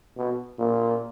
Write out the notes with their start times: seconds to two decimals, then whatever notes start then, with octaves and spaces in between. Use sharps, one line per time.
0.18 B2
0.59 A#2